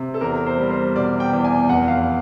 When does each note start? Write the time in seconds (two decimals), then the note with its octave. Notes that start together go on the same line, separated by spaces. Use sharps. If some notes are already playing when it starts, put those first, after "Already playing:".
Already playing: C3
0.14 A4
0.21 E2 A#4
0.46 C5
0.58 G3
0.71 C5
0.96 B2 D5
1.20 G5
1.33 E2
1.44 G#5
1.69 F1 F#5
1.88 F5